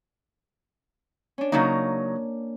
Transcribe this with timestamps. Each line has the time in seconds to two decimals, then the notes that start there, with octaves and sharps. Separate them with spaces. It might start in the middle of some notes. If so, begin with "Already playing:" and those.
1.38 C#4 D4
1.52 C#3 F#3 A#3 D#4